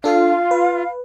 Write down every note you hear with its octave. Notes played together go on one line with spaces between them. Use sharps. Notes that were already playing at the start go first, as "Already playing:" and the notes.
D4 F4 A4 F5
B4